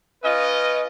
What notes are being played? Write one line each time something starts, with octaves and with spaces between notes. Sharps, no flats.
C#4 F4 B4 D#5